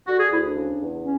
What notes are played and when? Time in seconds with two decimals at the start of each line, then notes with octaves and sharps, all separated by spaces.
0.07 D3 F#4
0.19 G#4
0.31 D2 E4
0.43 D4
0.54 C#3
0.79 E2
1.03 C#4